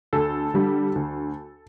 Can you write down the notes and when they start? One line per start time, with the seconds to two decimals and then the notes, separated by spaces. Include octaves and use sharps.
0.13 D2 A4
0.54 D3 G3
0.95 D2